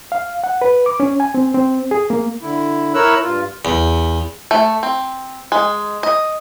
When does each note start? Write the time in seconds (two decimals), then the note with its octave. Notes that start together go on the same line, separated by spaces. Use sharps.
0.12 F5
0.44 F#5
0.62 B4
0.86 D6
1.00 C#4
1.20 G#5
1.34 C4
1.54 C4
1.91 G#4
2.10 A#3
2.42 D3 E4
2.95 E4 A#4 C#5 E6 F#6
3.23 G2 F4
3.65 E2
4.51 A3
4.83 C4
5.52 G#3
6.03 D#5